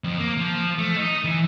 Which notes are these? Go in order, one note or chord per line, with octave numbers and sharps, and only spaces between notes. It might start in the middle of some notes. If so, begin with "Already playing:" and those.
F2
A#3
F3
A3
D#4
E3